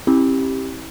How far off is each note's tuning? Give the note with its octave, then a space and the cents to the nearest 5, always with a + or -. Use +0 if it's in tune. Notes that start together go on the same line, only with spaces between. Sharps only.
C4 +40 E4 -20 G4 +0